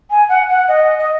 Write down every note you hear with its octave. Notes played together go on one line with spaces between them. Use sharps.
G#5
F#5
F#5
D#5
D#5